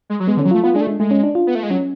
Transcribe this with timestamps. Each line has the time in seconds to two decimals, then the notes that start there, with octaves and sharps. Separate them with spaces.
0.10 G#3
0.20 F#3
0.28 G#3 B3
0.37 D3 C#4
0.45 F#3
0.51 A3 F4
0.64 B3 F4
0.74 G#3 D4
0.81 A3
0.87 G#3
1.00 G#3 A3
1.11 C#4
1.24 D4
1.35 F4
1.47 B3
1.55 A3
1.63 G#3
1.70 F#3 C#4